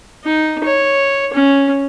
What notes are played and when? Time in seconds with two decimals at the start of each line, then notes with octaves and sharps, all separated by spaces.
0.24 D#4
0.64 C#5
1.33 C#4